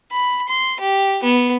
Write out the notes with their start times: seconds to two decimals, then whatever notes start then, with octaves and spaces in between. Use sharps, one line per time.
0.12 B5
0.49 C6
0.80 G4
1.23 B3